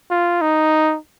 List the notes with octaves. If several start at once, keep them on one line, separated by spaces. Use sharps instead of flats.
F4
D#4